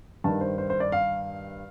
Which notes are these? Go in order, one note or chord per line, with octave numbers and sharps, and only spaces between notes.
G2 D#3 A5
C5
C5
C5
D5
F5